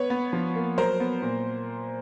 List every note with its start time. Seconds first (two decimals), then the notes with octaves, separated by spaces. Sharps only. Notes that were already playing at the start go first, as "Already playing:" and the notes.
Already playing: B3 B4 C#5
0.10 B3
0.33 F3
0.55 A#3
0.78 F#3 A#4 C5
1.00 B3
1.22 A#2